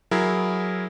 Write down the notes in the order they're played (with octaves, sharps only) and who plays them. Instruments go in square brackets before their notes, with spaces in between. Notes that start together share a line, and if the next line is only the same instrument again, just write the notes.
[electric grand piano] F#3 E4 G#4 A#4